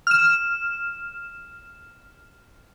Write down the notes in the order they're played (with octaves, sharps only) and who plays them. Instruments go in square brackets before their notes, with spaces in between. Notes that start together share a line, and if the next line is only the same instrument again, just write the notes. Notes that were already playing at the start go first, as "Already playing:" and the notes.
[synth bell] F6 E7